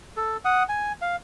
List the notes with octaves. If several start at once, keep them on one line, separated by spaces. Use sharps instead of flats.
A4
F#5 D#6
G#5
F5